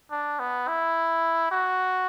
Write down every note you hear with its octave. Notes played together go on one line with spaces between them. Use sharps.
D4
B3
E4
F#4